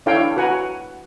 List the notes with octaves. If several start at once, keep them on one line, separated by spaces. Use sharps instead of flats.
D4 E4 A4 C#5 F5 G5
F#4 B4 F#5 G#5 A#5